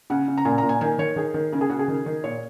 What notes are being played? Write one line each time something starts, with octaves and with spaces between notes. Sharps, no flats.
C#3 F#5
C#3
A#5
A#2 G#5
A#2 A#5
G#5
D#3 G#5
D#3 C#5
D#3 G#4
D#3
C#3 A#4
G#4
C#3 F#4
G#4
D#3
D#3
A#2 C#5